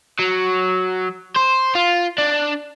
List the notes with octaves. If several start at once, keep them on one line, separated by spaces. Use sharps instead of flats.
F#3
C5
F4
D4